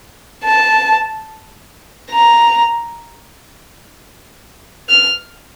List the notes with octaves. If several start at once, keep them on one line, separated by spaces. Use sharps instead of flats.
A5
A#5
F6